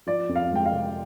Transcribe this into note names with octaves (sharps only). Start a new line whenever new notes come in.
F3 D5
F2
F5
G#3 G5
F5
C3